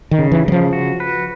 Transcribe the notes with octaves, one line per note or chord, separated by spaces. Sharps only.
D#3
C#3
E3
C#3 F#3
F3
F#4
B4